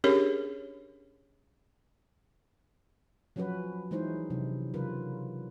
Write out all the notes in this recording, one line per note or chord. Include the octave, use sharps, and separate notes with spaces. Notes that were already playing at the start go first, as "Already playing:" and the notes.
C#4 D4 G4 G#4 A#4 C#5
F3 F#3 C#4 F#4 B4
E3 G#3 D#4 E4 C5
C3 F#3 D4
C#3 F#3 F4 A#4 B4